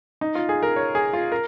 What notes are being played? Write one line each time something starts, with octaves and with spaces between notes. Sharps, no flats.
D#4
F4
G#4
A#4
C#5
G#4
F4
A#4